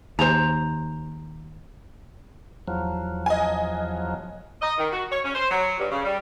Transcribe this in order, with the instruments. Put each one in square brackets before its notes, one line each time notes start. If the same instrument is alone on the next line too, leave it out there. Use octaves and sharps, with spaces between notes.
[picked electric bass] D#2 [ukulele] C5 A#5
[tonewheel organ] E2 F3 F#3
[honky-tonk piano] D#5 G#5
[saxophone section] D#5
D#3
F#4
C#5
C#4
C5
F#3
G2
C#3
G3